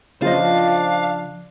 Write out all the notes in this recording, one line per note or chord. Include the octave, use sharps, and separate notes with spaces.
C#3 F3 D4 F4 C5 D#5 F5